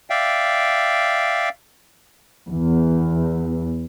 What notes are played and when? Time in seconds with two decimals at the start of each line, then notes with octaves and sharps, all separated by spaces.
0.10 D5 E5 F5 G5
2.47 E2